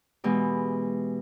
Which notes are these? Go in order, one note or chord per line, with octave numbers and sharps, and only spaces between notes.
B2 E3 G#3 G4